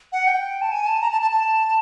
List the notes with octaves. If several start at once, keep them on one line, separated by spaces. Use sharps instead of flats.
F#5
G5
A5
G#5
A5
A#5
A5
A5
A5